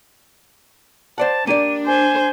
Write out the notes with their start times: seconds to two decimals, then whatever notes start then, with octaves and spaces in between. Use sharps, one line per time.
1.18 C5 D5 F#5 A5
1.47 A#3 D4 G4 D5 D#7
1.86 C5 G#5